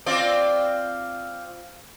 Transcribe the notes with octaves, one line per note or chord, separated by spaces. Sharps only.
C4 F4 D5